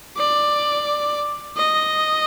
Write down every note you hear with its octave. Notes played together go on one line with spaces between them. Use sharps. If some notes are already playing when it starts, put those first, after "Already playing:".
D5
D#5